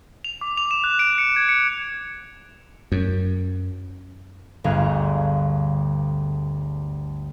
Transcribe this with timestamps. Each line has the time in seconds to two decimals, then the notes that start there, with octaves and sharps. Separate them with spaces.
0.24 F7
0.41 D6
0.57 F7
0.71 E7
0.84 F#6
0.99 D7
1.18 C#7
1.36 G#6
1.49 C#7
2.92 F#2
4.64 G1 D2 B3 G#4 F5